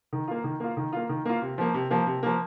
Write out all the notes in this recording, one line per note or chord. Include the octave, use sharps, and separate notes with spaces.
D#3
A#3 F4
D#3
A#3 F4
D#3
A#3 F4
D#3
A#3 F4
C3
F3 A#3
C3
F3 A#3
C3
F3 A#3